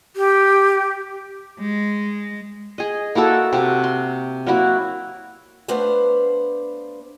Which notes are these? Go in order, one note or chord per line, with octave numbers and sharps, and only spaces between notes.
G4
G#3
G#4 D#5
A#3 E4 F#4 A4
C3 F#4
C6
F#3 A#3 E4 F#4
A3 B3 D4 B4 C5 F5